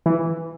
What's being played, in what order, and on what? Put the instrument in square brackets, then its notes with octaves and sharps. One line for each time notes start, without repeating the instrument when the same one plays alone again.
[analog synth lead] E3